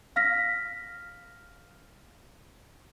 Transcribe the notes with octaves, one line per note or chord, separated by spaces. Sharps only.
F5 F6 A#6 B6